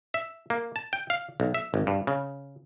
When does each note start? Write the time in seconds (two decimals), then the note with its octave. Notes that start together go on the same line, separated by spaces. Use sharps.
0.14 E5
0.50 A#3
0.76 A5
0.93 G5
1.10 F5
1.40 B1
1.54 E5
1.74 G#1
1.87 G2
2.07 C#3